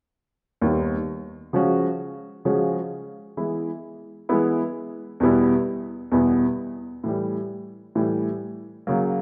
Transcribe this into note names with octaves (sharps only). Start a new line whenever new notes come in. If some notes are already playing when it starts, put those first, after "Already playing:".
D#2 D#3 G3 B3
C#3 F3 G#3 C#4 F#4
C#3 F3 G#3 C#4 F#4
E3 G#3 B3 E4
E3 G#3 B3 E4
E2 B2 G3 B3 E4
E2 B2 G3 B3 E4
A2 E3 G3
A2 E3 G3
C#3 F#3 A#3